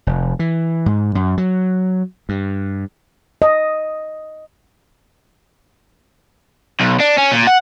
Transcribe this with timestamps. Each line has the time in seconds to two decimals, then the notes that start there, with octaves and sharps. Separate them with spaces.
0.07 F1
0.39 E3
0.86 G#2
1.15 F#2
1.38 F#3
2.29 G2
3.42 D#5
6.80 B1
7.00 D4
7.17 C#4
7.32 A#2
7.47 F#5